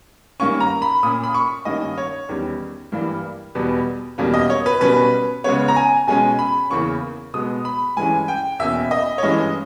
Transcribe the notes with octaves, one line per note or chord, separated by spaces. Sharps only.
G2 D#3 A#3 C#4 C#6
A#5
B5
A#2 A#3 C#4 D#6
B5
C#6
G2 D#3 A#3 C#4 D#5
C#5
E2 D#3 G3 C#4
G2 E3 G3 A#3
E2 B2 G3 B3
E2 B2 G3 A#3 C#4
D#5
C#5
B4
B2 G3 C#4 B4
C#3 G#3 B3 C#5
A#5
G#5
B2 G#3 C#4 G#5
B5
E2 C#3 E3 A#3 C#4 C#6
B2 G#3 B3 D#6
B5
G2 E3 G#3 C#4 G#5
G5
E2 B2 A#3 C#4 E5
D#5
C#5
G2 E3 G#3 C#4 D#5